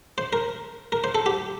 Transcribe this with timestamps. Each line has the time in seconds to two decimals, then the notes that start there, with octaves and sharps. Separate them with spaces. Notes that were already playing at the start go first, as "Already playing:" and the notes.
0.18 C5
0.33 A#4
0.92 A#4
1.04 C5
1.15 A4
1.26 G4